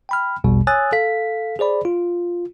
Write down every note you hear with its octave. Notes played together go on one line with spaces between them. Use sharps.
G5 B5 F6
A#1 E2 B2 G3
C#5 G#5 D#6 E6 F#6 A6
A4 F5 B6
G#4 C5 D5 B5
F4